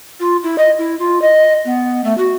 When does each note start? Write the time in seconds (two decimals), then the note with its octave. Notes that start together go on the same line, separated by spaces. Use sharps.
0.20 F4
0.43 E4
0.58 D#5
0.79 E4
0.99 F4
1.22 D#5
1.65 B3
2.04 A3
2.18 F#4